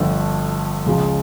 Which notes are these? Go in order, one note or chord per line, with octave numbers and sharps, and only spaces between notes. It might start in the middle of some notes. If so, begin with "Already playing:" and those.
Already playing: G1 F2 D3 F3 A3
C#2 C#3 F3